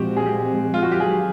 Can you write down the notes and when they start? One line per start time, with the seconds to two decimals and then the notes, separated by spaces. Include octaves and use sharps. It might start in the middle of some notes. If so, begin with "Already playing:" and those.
Already playing: A#2 F3 G#3 C4 F#4 G4
0.17 G#4
0.26 G4
0.74 F4
0.82 F#4
0.92 G4
0.99 D#3 F#3 G#4